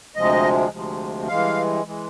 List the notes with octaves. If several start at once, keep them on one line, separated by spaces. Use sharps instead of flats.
D2 C3 F3 G#3 D#5
D2 C3 F3 G#3
G2 E3 G#3 F5
E3 G#3